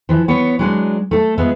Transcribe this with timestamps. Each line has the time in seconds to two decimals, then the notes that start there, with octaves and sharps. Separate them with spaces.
0.09 E3 F3
0.28 B3 C#5
0.59 F#3 G#3 D4
1.11 A3 A4
1.38 G#3 B3 F4 G#4 E5